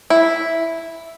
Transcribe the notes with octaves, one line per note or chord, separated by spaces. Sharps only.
E4